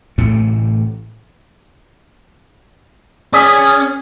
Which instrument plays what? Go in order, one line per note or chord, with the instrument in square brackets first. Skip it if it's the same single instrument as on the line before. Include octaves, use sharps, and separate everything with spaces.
[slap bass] A1 A2 C3 A3
[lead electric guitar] C#4 [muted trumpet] G#4 [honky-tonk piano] D5 D#6 B6